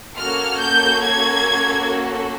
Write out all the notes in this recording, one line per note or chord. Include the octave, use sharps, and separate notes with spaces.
A#3 C#4 F#4 A4 F6
G6
G#6